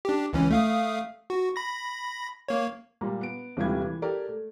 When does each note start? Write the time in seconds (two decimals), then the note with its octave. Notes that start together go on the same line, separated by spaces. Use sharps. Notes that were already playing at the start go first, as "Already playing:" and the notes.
0.05 D4 G4
0.33 C#2 E3 C#4
0.51 A3 F5 D#6
1.30 F#4
1.56 B5 A#6
2.48 A#3 C#5
3.01 A#2 G3 A#5
3.21 B3 D7
3.57 D#1 C3 E3 G3 B4 G#6
3.82 E3
4.02 G4 A4 A#4 D5
4.28 A3